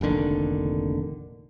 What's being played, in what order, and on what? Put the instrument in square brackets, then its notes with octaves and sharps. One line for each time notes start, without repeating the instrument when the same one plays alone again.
[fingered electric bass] F1 A#1 D3 D#3